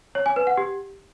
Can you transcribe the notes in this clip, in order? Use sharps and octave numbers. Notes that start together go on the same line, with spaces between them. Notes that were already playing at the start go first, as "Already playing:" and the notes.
C#5
G#5
B4
F#5
G4